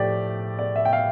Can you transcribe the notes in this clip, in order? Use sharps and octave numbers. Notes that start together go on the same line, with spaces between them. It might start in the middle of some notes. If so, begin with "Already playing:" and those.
Already playing: A2 F3 A3 G4 D5
D5
E5
G5
F5